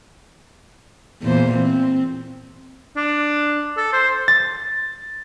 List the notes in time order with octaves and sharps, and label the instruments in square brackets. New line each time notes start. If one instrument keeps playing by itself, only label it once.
[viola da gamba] E2 A#2 C5
C4
[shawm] D4
A4
C5
[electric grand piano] A6